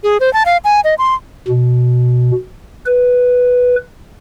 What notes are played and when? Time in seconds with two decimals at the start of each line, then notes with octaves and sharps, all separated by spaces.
0.04 G#4
0.20 C5
0.33 A5
0.46 F5
0.64 G#5
0.84 D#5
0.98 C6
1.48 B2
2.86 B4